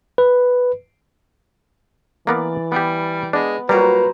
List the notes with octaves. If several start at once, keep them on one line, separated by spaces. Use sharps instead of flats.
B4
E3 A#3 B3 A#4 D5
G3 B3 G4
G#3 B3 D4
A#2 F#3 G3 B4 C5 A#5